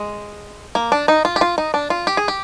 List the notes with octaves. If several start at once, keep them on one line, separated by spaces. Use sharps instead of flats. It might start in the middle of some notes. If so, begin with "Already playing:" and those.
Already playing: G#3
A#3
D4
D#4
F4
G4
F4
D#4
D4
F4
G4
G#4
G4